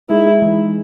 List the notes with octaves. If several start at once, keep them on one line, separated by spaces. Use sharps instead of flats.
G#3 D#4 E4 G#4
E3 G#3 D#4 G#4